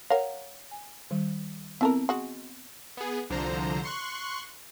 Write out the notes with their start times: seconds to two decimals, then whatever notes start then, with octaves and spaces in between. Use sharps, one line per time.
0.10 A#4 C#5 F5 F#5
0.71 G#5
1.11 D#3 G3
1.81 B3 C4 E4 A4 A#4 A5
2.09 G#3 F#4
2.97 B3 G#4
3.30 C2 D3 F3 C5 A#5
3.83 C6 C#6 F#6